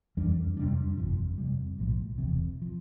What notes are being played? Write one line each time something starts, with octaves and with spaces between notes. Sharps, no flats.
F2 E3 G3 D4
F2 C3 G3 D4
G1 F2 C3 F3
F2 C3 G3
B1 A2 F3
E1 E2 C3
F3